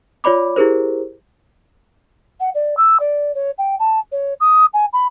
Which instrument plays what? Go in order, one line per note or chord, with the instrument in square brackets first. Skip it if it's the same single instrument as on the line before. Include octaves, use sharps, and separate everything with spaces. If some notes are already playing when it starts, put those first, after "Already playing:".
[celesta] F4 C#5 D5 B5 D6
E4 G4 G#4 A#4 C5
[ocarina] F#5
D5
E6
D5
C#5
G5
A5
C#5
D#6
G#5
B5